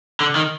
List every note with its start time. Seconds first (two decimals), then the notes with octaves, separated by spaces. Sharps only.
0.20 D3
0.36 D#3